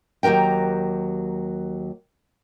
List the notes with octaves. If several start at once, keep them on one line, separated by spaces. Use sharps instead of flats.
D#2 F#3 G4 A#4 G5